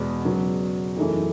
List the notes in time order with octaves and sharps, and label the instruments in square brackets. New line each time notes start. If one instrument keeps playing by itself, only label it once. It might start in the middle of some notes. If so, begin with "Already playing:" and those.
Already playing: [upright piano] E2 B2 G#3 B3
C#3 F#3 B3
F#2 E3 A3 D#4 G#4